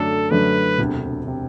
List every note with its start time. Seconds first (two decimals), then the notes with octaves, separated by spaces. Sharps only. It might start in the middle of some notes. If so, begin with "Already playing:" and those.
Already playing: F#2 D3 F#3 A3 D4 A4
0.31 F#2 D3 F#3 A3 D4 B4
0.78 E1 D2 C3
1.27 C3